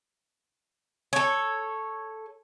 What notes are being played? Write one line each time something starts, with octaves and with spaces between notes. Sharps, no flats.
A4 C#5